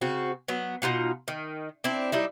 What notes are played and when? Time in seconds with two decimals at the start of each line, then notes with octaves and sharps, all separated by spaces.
0.01 C#3 C4 F#4
0.48 F#3 B3
0.82 B2 D#4 F4 F#5
1.28 D#3
1.84 C4 D4 E4
2.12 G3 D#4 E4